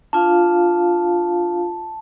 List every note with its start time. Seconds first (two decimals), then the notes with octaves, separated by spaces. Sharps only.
0.13 D4 F4 F5 A5